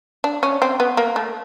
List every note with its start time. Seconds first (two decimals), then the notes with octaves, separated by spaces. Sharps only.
0.24 D4
0.43 C#4
0.62 C4
0.80 B3
0.97 A#3
1.16 A3